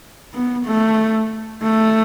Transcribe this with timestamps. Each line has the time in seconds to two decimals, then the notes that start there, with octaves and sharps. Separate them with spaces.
0.34 B3
0.66 A3
1.63 A3